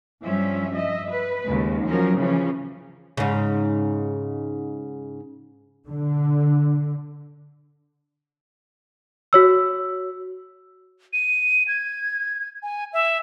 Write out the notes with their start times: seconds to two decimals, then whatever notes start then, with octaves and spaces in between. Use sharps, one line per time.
0.22 G2 F3 G3 C#4 E5
0.74 D#5 E5
1.10 B4
1.44 D#2 C#3 G#3
1.85 F3 F#3 C#4 A#4
2.17 C#3 E3 F3 C#4
3.17 G#2 C#3
5.87 D3
9.33 F#4 C#5 E6
11.13 D#7
11.68 G#6
12.63 G#5
12.93 E5